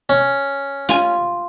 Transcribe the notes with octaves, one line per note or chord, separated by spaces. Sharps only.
C#4
F4 G#5